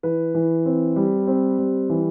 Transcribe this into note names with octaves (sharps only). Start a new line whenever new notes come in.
E3 B4
E3
C4
G3
C4
G3
E3